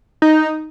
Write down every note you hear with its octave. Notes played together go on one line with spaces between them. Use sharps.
D#4